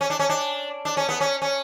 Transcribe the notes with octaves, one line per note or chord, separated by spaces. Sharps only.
C#4
D4
C#4
D4
D4
C#4
B3
C#4
C#4